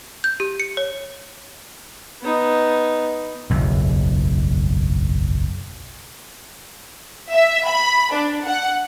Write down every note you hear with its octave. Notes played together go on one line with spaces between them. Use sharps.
G6
G4
C#7
C#5
B3 D#4
F#1 B1 E2
E5
B5
D4
F#5